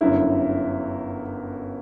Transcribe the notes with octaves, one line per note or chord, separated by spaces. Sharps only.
G1 F#2 D3 E4